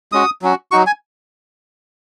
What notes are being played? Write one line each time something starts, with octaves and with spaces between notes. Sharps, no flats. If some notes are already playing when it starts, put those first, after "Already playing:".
G#3 C#4 F#4 D#6
F#3 C#4 F#4
F#3 D#4 F#4 C#6
G#5